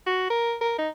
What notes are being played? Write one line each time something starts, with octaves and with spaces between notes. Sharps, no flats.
F#4
A#4
A#4
D#4